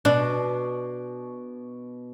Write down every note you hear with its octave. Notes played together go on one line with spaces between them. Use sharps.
B2 D4